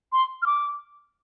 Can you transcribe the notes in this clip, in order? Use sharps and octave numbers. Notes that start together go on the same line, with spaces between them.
C6
F6
D6